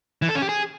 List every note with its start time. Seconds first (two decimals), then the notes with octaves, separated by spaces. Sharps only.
0.22 E3
0.29 A4
0.35 C#4
0.42 G4
0.49 G#4